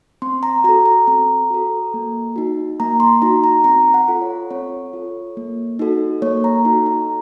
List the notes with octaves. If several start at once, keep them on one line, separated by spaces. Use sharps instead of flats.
C4 C6
A#5
F#4 A4 A#5
A#5
C4 A#5
F#4 A4
A#3
D#4 F#4
A#3 A#5
C6
D#4 F#4 A#5
A#5
C4 A#5
F#5
F4 A4
C#5
C4 C#5
F4 A4
A#3
D#4 F#4 A4
A#3 C#5
A#5
D#4 F#4 A4
A#5